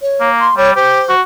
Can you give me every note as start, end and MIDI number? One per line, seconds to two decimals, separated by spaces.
0.01 0.29 73
0.20 0.48 58
0.40 0.55 84
0.57 0.74 55
0.57 0.71 73
0.76 1.01 67
0.76 1.14 72
1.09 1.21 66